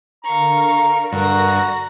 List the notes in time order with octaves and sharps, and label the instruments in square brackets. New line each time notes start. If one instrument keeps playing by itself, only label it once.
[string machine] D3 A#4 [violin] F5 C#6 [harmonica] A#5
[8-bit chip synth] G2 [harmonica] F#4 [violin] A#5 A#6